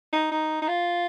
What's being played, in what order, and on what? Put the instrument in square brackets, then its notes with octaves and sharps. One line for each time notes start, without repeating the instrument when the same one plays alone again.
[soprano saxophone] D#4
D#4
D#4
F4